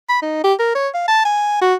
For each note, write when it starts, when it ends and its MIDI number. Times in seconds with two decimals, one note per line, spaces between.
0.09 0.19 83
0.22 0.42 63
0.44 0.54 67
0.59 0.74 70
0.75 0.88 73
0.94 1.05 77
1.08 1.21 81
1.25 1.57 80
1.61 1.74 66